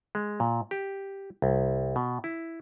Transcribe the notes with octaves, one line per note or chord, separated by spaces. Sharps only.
G#3
A#2
G4
C2
B2
E4